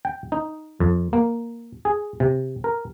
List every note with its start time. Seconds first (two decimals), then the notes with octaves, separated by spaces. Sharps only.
0.05 G5
0.32 D#4
0.80 F2
1.13 A#3
1.85 G#4
2.20 C3
2.64 A#4